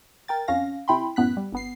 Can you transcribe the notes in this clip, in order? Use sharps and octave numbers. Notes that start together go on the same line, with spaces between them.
A#4 G5 A6
F2 C#4 F5 A#6
C3 E4 G5 B5 C6
F#2 A2 B3 F#6 B6
G3
G1 B3 C7